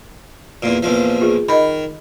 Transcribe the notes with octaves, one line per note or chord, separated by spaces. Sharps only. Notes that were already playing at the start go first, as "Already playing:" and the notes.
E2 A#2
A#1 E2 F3
F4 G#4
D#3 D#5 B5